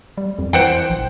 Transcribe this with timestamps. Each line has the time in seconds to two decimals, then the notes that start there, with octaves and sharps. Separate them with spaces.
0.18 G3
0.39 F2
0.53 E3 C5 F#5 G5
0.90 A#1